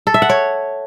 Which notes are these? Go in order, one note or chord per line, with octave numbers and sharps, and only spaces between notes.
A4
E5
F#5
C#5